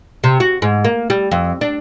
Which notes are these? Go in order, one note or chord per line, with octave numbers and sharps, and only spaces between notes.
C3
F#4
G#2
A#3
G3
F2
D4